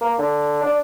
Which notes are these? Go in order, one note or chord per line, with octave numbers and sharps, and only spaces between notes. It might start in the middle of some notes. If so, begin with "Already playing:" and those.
A#3
D3
D4